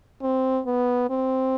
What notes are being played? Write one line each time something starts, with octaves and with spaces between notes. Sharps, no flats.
C4
B3
C4